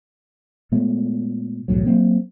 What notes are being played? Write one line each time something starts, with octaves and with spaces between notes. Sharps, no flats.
A#2 G#3 A3 B3
B1 E2 A2 F#3
F#3 A#3 C4